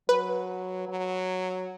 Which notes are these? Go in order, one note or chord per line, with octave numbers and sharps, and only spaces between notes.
F#3 B4
F#3